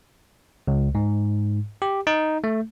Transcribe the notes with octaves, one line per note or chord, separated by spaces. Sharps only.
C#2
G#2
G4
D#4
A3